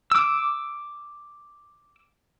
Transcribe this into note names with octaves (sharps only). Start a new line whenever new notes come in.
D6 E6